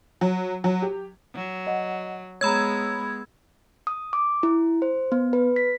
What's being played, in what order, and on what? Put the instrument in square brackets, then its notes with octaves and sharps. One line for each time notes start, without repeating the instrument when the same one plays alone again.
[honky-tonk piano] F#3
F#3
G4
[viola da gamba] F#3
[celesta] D#5 F#5
[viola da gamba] G#3 B3 [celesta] C#5 A#5 [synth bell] B5 E6 G#6
[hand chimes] D#6
D6
E4
C5
B3
B4
B6